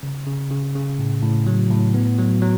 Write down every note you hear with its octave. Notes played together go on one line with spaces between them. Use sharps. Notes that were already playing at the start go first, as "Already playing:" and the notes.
C#3
C#3
C#3
C#3
A2
A2
F#3
A2
B3
F#3
F#3